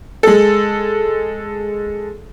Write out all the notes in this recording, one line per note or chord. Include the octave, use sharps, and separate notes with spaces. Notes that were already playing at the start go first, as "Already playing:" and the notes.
G#3 A4